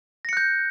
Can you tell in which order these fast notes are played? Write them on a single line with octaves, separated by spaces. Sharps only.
A#6 C#7 F#6 G6